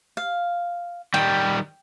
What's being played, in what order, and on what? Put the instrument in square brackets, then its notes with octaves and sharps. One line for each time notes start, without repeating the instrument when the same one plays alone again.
[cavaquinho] F5
[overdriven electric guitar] D#3 G3 [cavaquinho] G5